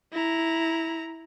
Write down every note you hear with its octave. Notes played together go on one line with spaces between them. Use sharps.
E4 A#5